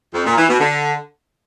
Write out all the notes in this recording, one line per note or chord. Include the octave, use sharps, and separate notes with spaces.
F2
A#2
E3
B2
D3